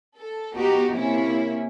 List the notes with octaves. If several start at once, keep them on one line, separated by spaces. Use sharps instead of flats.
A4
B3 D#4 F#4 G4
C3 A#3 C#4 E4